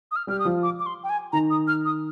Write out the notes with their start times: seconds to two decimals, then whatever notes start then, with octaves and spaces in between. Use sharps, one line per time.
0.12 D#6
0.16 F6
0.27 G3 G4 F6
0.39 D#6
0.45 F3 F4
0.63 D6
0.80 D6
0.86 C6
1.04 G5
1.10 G#5
1.33 D#3 D#4 A#5
1.50 D#6
1.68 F6
1.85 D#6